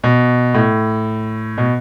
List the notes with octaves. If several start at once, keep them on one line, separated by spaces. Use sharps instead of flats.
B2
A2
B2